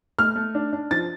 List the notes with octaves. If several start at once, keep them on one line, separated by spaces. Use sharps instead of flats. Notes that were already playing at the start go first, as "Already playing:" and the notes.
A3 F6
A3
D4
D4
F3 A6